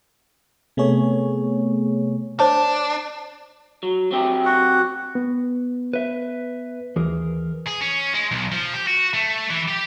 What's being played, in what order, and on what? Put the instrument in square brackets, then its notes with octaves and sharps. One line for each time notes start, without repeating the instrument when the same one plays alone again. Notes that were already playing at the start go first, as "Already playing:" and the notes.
[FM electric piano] C3 A3 B3 G#4 C#5
[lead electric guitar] D4 [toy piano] C5 C#5 A5
[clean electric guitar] F#3
F#3 C4 G4
[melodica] F#4 F#5
[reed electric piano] B3
[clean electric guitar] B4 E5
[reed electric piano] D#2 [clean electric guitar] E3 G#4 A#4
[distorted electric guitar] G#4
C#4
G#3
B1
F3
G4
F#4
A3
E3
G4